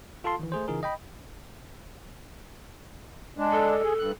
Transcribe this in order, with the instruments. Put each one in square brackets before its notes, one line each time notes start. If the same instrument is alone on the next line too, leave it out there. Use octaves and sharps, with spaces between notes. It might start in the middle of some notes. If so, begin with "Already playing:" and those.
[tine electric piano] F4 A4 F5 A5 C6
D#3 E3
A3 G#4 C5
C#3 E3 D#4 F4 G#4 A#4
D#5 G5 B5
[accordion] G#3 D4
[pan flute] A4
[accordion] G#4
G2 F#6